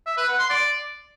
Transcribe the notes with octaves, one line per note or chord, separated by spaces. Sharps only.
E5
B4
F#5
C6
D5